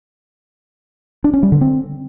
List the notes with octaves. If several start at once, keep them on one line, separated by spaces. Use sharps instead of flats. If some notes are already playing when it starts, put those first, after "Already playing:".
D4
C#4
G3
D3
C4